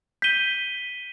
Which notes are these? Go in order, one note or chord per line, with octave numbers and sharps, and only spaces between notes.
G6 B6 D#7 G7